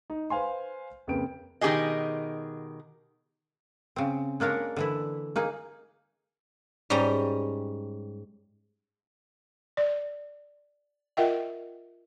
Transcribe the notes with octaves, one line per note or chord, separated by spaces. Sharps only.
D#4
B4 C5 F5 G#5 C6
F2 C#3 A#3 B4 G5 D7
B2 D#3 B3 G4 G#4 D#5
C#3 C4
G#3 A#3 D4 A#4 C#5
D3 E3 E4
A#3 D#4 G#4
G#2 G3 C#4 G5 A#5
D5
F4 A#4 D#5 E5 F#5 G5